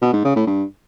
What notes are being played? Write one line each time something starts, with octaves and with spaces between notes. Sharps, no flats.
B2
G#2
C#3
A2
G2